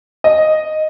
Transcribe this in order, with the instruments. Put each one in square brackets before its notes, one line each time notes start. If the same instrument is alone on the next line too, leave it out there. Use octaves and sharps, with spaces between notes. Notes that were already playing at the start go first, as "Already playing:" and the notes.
[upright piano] D#5